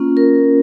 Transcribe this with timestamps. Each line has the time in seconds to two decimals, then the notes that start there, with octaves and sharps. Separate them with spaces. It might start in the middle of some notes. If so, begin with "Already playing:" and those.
Already playing: A#3 C#4 F4
0.17 A#4